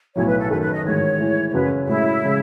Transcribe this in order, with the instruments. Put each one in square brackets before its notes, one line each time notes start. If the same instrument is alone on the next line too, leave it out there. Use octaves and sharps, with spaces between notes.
[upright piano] B1 A2 F#3 [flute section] C#5
[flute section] B4
A4
[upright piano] F#2 D#3 A3 [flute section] B4
[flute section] B4
D#5
[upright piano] A1 G#2 D#3 [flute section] C#5
[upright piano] A2 E3 G#3
[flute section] C#5
[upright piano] F#2 C#3 F#3 C#4 F#4 [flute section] B4
[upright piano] A2 G#3 C#4 G#4 [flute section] E4
[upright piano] C#3 G#3